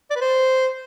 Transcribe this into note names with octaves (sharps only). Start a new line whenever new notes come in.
D5
B4
C5